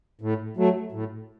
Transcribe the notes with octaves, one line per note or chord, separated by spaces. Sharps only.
A2
F#3 A3
A2